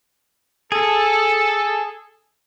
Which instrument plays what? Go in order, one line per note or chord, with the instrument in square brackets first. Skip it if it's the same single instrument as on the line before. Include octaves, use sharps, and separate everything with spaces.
[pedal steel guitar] G#4 [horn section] A4